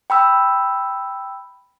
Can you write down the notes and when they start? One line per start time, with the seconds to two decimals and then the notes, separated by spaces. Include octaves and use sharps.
0.10 G5 B5 E6